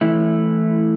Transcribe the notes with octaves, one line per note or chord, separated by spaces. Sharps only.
E3 A3 E4